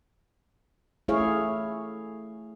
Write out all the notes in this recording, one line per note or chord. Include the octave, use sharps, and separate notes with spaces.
A3 E4 G#4 C#5 F5